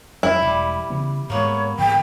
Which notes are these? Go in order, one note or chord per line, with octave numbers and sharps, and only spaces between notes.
F2 F#3 G3 E4
E1 G3
C#3 E3 B3
G#2 G#3 A#3 B3 C#5
G#2 D3 E3 G5